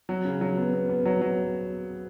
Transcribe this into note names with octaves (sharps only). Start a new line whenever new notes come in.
F#3
C#3
F#3
B3
B3
B3
F#3
F#3